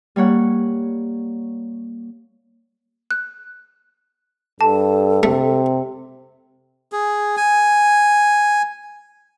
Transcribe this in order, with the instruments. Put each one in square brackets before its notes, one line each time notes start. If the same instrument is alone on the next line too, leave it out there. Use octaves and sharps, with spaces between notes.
[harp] G3 A#3 C#5 F#5
[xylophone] F#6
[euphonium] G2 [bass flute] A4 [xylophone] A5
[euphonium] C3 [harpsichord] A3
[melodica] G#4
G#5